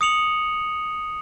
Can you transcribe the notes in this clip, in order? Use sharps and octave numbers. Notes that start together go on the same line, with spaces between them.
D#6 C#7 F7 F#7